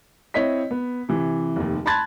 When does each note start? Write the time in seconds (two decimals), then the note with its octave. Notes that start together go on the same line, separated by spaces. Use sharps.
0.34 C4 E4 C#5 D#5 B6
0.71 B3
1.09 C3 E3
1.56 F1 D#2
1.86 A5 B5 C6 F#6 G#6 A6